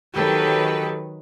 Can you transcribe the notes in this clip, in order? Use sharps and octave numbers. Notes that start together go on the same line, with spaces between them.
D#3 F#3 G4 A4 B4